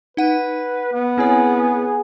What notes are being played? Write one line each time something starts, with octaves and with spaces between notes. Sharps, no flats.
D#4 B4 F#5 D#7
B3
C4 E4 G#4 C#5